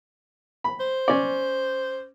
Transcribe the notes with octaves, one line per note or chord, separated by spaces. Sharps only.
B5
C5
C#4 D5